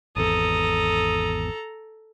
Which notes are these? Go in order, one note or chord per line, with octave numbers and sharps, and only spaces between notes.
G#1 E2 A4 A#5 D#6